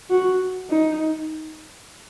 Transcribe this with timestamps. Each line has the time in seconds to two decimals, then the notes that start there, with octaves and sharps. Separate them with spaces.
0.10 F#4
0.70 D#4